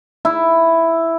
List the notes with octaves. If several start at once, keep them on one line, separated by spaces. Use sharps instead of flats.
E4